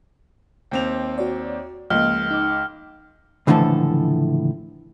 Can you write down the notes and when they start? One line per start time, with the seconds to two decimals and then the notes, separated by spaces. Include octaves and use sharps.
0.71 D#2 C4 F7
1.18 F#4 C#5 D5
1.90 C#2 F3 A#3 F6
2.30 D#4 D6
3.47 C#2 A2 D3 E3 F3 A4